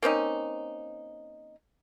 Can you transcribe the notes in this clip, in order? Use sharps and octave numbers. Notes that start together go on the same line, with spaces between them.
A#3 C4 C#4 D#4